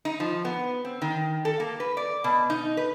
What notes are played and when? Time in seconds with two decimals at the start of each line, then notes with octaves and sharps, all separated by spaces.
0.05 D#4
0.20 F3
0.45 B3
0.85 C4
1.02 D#3
1.45 A4
1.60 A#3
1.80 B4
1.97 D5
2.24 B2
2.50 D#4
2.77 B4